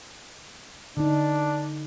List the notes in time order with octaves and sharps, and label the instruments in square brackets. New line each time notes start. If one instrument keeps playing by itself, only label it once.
[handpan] D3 D#4 [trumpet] D4